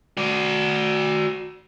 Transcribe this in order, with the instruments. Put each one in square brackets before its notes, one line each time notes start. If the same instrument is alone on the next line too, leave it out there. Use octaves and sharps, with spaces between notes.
[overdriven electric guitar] F#4 D5